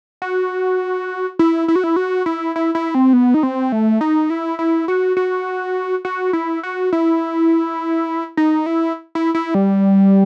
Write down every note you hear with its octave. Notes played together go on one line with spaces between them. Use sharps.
F#4
E4
E4
F#4
E4
F#4
E4
E4
E4
C4
B3
D#4
C4
A3
D#4
E4
E4
F#4
F#4
F#4
E4
F#4
E4
D#4
E4
E4
E4
G3